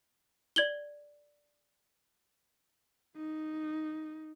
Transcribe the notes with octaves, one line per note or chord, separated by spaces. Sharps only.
D5 G#6 F#7 G7
D#4